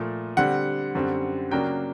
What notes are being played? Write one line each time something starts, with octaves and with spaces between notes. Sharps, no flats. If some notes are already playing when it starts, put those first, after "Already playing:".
Already playing: A#2 F3 A3
D3 G3 C4 F#5
F#2 D3 G3 C4
C#3 F#3 A#3 D4 G5